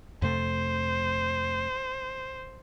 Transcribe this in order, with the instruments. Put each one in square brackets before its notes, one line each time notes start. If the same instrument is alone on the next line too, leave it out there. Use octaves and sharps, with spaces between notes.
[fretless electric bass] F2 C3 A3 [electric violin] C5